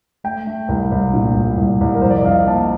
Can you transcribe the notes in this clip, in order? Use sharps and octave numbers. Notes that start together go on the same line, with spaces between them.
A3 G5
A3
C2
C2
A#2
C2
C2
C2
A#4
F2 C5
D5
D#5
F2 F5
A#3 A5